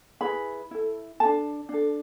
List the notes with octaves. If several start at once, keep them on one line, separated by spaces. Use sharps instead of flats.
E4 G#4 B4 B5
E4 A4
D4 A4 A5
D4 A4